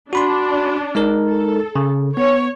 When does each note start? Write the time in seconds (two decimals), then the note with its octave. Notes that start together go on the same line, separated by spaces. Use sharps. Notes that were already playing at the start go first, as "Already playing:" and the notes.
0.13 D4 F#4 B5 C6
0.95 G#3 D#4 A#4
1.27 A4
1.76 C#3
2.17 B3 C#5